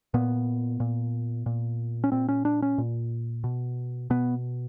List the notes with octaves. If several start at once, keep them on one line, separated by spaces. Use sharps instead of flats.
A#2 B3
A#2
A#2
C#4
A#2 C4
C#4
D4
C#4
A#2
B2
B2 B3